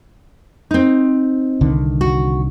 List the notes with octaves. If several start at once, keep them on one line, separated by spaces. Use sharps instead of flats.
C4 D#4
C2 D3 D#3
F#4